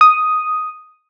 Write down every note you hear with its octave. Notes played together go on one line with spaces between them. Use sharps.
D#6